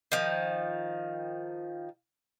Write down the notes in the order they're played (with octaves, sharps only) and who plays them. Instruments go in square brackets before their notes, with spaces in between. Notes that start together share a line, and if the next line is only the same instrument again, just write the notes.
[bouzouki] D#3 F3